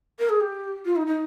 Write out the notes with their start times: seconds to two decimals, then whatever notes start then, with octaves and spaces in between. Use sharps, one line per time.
0.19 A#4
0.29 G#4
0.40 G4
0.85 F4
0.96 D#4
1.07 D#4